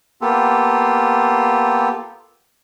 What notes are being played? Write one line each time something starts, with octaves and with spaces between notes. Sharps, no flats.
A#3 B3 F4 G4 A4